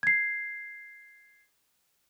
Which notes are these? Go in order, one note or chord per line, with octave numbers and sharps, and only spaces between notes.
G#6 C7